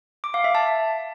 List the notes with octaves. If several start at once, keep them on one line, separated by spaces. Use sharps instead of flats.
D6
F5
E5
A5